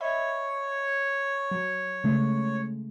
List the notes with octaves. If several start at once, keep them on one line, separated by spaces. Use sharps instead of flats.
C#5 D#5 E5 B5
F#3
C#3 G#3 A3